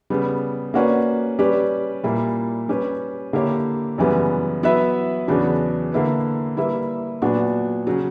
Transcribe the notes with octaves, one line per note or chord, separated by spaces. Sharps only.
C#3 G3 B3
A#3 C#4 F#4 B4 D5
G3 C#4 G4 B4 D5
A#2 G3 A#3 E4
G3 C#4 G4 B4
D3 A#3 E4 G4 C#5
F#2 C#3 E3 G3 B3
F#3 B3 E4 B4 E5
E2 C#3 F#3 B3 D4
D3 A#3 E4 B4
G3 A#3 E4 B4 E5
A#2 F#3 B3 D4 F#4
C#3 F#3